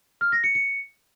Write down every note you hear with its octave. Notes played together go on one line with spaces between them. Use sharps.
F6
A#6
C#7
C#7